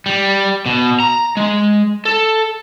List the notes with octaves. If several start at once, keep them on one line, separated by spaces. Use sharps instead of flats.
G3
B2
A#5
G#3
A4